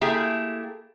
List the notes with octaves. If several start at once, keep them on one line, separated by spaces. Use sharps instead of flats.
A3 A#3 E4 G4 G#4